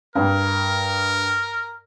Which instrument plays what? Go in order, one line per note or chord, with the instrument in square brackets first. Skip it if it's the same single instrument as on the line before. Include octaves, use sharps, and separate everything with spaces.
[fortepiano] G2 [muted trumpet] A#4